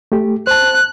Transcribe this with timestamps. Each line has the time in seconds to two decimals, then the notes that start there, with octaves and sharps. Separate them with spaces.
0.12 A3 G4
0.47 C5 A5 F#6